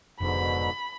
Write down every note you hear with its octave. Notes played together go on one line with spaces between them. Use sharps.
F1 G#2 B2 D3 B5